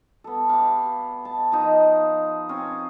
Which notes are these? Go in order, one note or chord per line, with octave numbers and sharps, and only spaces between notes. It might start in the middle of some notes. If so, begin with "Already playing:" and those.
B3 A4
G4 F5
A5
F3 D#4
C4 C#4